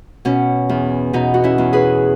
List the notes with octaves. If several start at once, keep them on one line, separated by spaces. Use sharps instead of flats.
B2 C#4
E2
B2 D#4
F#4
C#4 E4
E2
G#4 B4